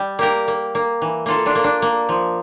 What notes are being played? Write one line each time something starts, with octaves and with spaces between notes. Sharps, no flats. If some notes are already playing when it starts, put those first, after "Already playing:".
Already playing: G3
A#3 G4 A#4
A#3
A#3
E3
A#3 F4 A4
D4 F4
A#3
D4
A#3
F3